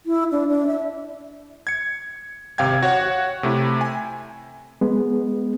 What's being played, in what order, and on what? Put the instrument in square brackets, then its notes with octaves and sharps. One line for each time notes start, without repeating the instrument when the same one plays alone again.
[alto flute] E4
D4
D4
E5
[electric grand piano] G#6 C#7
G#1 C3 F5 G5 G#6
F#4 C#5 F#5
C3 A3 E4
G#5
[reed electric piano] G#3 B3